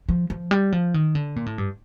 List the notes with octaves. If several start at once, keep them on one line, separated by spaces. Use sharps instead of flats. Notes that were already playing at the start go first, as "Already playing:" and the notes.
F3
F3
G3
F3
D#3
D3
A#2
A2
G2